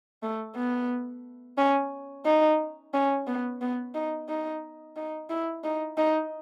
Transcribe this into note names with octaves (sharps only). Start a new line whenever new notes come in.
A3
B3
C#4
D#4
C#4
B3
B3
D#4
D#4
D#4
E4
D#4
D#4